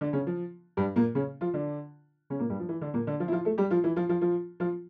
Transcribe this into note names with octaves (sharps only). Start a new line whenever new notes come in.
D3 D4
C#3 C#4
F3
G2 G3
A#2 A#3
C#3 C#4
F3 F4
D3 D4
C#3 C#4
A#2 A#3
G2 G3
F3
E3
D3 D4
A#2 A#3
D3 D4
F3 F4
E4
F3 F4
A3 A4
G3 G4
F3 F4
E3 E4
F3 F4
F3 F4
F3 F4
F3 F4